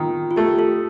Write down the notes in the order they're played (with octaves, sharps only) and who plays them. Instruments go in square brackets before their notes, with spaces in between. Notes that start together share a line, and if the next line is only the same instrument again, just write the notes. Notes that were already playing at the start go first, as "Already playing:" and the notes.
Already playing: [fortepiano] D#3 [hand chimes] F4
[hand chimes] F4
[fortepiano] A3 [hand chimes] G4
[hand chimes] A4